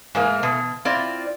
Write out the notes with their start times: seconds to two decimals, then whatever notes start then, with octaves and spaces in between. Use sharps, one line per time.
0.15 G#2 E3 A3 A#3
0.43 B2
0.85 C4 E4 F4 D5